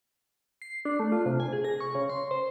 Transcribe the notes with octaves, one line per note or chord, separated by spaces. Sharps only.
C7
D4
A3
F4
C3
G#5
G#4
A#6
C#6
C#3
C6
C5